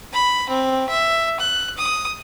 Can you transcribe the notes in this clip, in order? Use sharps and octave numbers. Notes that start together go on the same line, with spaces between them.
B5
C4
E5
F#6
D#6